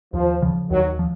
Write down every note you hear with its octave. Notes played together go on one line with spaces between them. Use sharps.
D#2 F3
C#3 F3
D#2 D#3 F#3
F3